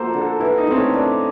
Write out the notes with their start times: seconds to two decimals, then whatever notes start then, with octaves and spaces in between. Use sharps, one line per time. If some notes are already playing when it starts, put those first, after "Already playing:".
Already playing: F3 A#3 F#4 A4 C5
0.14 D3
0.21 A4
0.40 E3 E4
0.58 D#4
0.67 A3 C4
0.76 C#4
0.94 D4